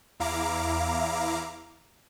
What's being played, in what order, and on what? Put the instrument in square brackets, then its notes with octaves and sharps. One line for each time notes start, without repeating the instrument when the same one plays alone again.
[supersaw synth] E2 E4 F5 A#5 D6